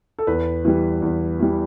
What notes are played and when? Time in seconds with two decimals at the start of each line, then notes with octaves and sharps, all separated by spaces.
0.19 A4
0.27 E2 B4
0.65 E3 G3
1.02 E2
1.40 E3 G3